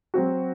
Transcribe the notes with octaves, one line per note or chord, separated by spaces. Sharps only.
F#3 C4 F#4